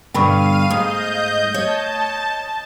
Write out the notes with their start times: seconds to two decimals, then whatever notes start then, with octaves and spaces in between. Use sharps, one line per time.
0.14 G2 B2 D3 F5 G5 B5 C#6 D#7
0.70 G#2 A3 D#5 D#6 G6
1.54 C#5 A5